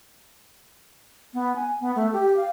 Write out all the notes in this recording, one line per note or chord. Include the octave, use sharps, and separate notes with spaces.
B3
G#5
B3
A3
G4
F5